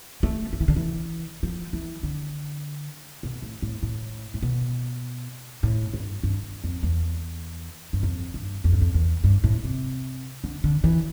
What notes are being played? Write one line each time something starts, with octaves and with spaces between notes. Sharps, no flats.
A3
F3
E3
D3
E3
F3
E3
D3
B2
A2
A2
A2
A2
B2
A2
G2
G2
F2
E2
G2
F2
G2
F2
G2
F2
E2
G2
A2
C3
D3
D3
E3